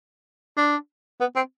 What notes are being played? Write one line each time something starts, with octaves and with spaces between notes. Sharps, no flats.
D4
B3
C4